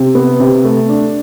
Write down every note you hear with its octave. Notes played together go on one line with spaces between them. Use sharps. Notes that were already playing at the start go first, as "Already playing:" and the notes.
Already playing: C3
B3
C3
A3
D4